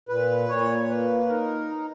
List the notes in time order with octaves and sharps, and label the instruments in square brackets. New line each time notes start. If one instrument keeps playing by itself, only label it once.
[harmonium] A#2 B4
A#2 C#5
A#3 B4
D#4 A#4